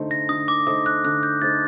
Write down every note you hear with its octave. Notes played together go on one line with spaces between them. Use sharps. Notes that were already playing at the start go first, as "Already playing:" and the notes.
Already playing: D3 A3 D#4 A4 C5
A#6
D3 D#6
D6
A3 D#4 A4 C5 D#6
F#6
D3 F#6
G6
A3 D#4 A4 C5 A6